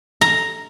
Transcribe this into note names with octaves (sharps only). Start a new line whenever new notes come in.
A#5